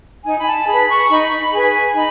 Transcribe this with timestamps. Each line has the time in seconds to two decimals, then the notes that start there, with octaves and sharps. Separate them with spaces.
0.25 D#4 G#5
0.39 B5
0.46 A5
0.67 G#4 B4 B5
0.89 C#6
1.10 D#4 B5
1.53 G#4 B4 G#5
1.95 D#4 B5